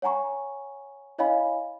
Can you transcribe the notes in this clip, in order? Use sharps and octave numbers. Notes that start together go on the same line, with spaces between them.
C#5 F#5 G#5 A#5 C#6
E4 C#5 D#5 F5 G#5 B5